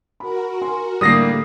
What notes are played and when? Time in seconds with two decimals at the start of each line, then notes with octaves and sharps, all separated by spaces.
0.20 F#4 A#4 B5
0.62 G#5 C6
1.01 A2 D3 G3 A3 A#3 D#6 A#6 C7